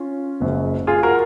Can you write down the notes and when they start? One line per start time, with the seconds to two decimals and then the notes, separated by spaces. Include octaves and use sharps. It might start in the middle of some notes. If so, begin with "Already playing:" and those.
Already playing: C#4 F4
0.40 F#1 F#2 F3 G#3
0.87 F4 G#4
1.03 F#4 A#4